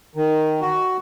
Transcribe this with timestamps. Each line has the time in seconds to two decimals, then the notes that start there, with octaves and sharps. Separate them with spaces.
0.15 D#3
0.61 F#4